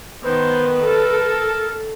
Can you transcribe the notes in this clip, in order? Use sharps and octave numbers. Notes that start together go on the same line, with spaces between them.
D#3 B3 B4 C5
A4 A#4